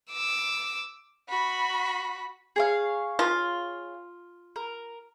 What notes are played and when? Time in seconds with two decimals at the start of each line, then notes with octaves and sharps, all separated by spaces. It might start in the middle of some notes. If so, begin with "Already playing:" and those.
0.11 D6 E6
1.29 F#4 B5
2.56 G#4 C#5 F5
3.19 F4
4.56 A#4